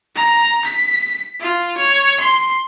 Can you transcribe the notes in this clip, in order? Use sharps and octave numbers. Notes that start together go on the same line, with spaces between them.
A#5
B6
F4
C#5
C6